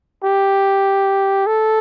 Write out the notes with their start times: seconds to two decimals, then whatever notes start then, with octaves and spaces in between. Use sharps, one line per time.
0.24 G4
1.47 A4